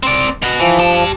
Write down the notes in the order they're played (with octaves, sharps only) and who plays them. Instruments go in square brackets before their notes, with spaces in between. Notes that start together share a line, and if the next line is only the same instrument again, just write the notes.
[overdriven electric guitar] C4 D5
B2 F#4
[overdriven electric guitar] E3 [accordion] F3
[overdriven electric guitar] G4 A5